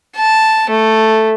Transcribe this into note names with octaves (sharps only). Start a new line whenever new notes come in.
A5
A3